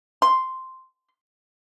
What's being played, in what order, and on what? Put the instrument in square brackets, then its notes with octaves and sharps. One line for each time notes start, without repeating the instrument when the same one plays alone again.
[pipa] C6